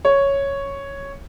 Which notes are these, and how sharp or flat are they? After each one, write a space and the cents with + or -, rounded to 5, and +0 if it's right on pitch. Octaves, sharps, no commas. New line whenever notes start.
C#5 +0